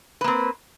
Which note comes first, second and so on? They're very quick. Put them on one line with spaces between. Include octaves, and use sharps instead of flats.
B4 A#3 C4